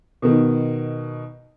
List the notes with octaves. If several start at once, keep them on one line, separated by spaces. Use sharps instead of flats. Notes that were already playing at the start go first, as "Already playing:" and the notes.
B2 D#3